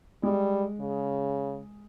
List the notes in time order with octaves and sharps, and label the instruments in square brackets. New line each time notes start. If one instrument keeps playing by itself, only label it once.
[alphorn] G3 [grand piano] G#3
[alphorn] C#3